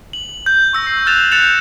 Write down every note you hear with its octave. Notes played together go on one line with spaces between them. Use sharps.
F#7
G6
C#6 E6 A#6
C7
F6 F#6 A6 E7 F7
F#6 G6 A6 C#7 E7 F7